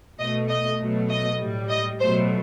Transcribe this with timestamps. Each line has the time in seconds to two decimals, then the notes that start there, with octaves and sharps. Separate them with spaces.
0.20 B2 A3 D#5
0.49 D#5
0.80 B2 F#3 A3
1.10 D#5
1.40 A2 G3
1.69 D#5
2.00 B2 F#3 A3 C5